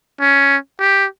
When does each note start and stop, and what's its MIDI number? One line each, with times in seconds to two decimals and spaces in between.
0.20 0.56 61
0.79 1.06 67